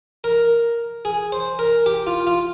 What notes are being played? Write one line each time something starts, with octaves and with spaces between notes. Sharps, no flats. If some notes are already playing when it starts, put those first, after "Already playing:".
A#4
G#4
C5
A#4
G4
F4
F4